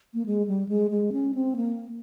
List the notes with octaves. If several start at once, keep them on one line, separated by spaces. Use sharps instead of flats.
A#3
G#3
G3
G#3
G#3
C#4
C4
A#3